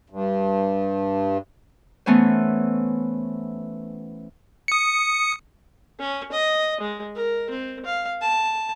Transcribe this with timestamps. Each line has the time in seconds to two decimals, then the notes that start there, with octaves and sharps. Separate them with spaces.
0.10 G2
2.06 E3 A3 B3 C#4 C5
4.68 D#6 C#7
5.99 C#4
6.32 D#5
6.81 G#3
7.15 A#4
7.50 C4
7.85 F5
8.22 A5